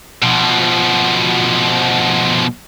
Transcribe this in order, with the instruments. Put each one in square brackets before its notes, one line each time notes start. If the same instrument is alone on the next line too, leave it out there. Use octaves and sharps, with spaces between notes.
[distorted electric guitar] B2 F3